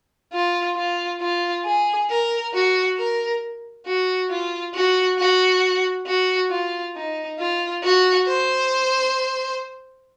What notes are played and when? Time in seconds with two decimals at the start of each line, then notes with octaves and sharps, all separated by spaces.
0.33 F4
0.76 F4
1.21 F4
1.65 G#4
2.09 A#4
2.54 F#4
2.98 A#4
3.86 F#4
4.30 F4
4.74 F#4
5.19 F#4
6.07 F#4
6.50 F4
6.96 D#4
7.39 F4
7.83 F#4
8.27 C5